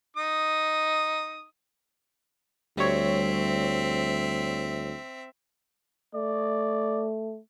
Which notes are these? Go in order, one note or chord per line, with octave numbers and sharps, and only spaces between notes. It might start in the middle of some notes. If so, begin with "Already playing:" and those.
D#4 D#6
D2 G3 C4 C#5 E5
A3 D5